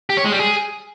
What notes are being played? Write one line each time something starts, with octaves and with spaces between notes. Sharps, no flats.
G4
C#5
G#3
G3
G#4